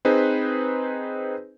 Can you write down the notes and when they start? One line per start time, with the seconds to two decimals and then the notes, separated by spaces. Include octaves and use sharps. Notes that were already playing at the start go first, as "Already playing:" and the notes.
0.05 C4 D#4 G#4 B4 C5